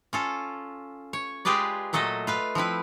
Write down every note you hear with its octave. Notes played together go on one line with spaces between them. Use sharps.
C#4 F4 A4
C#5
G#3 F4 G4 G#4 B4 D5
A#2 F#3 A3 A4 D#5
F4 B4 F5
F3 C4 E4 B4